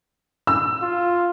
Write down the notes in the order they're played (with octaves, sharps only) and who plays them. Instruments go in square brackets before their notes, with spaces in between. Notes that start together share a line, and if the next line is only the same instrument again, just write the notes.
[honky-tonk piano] E6
[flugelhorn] F4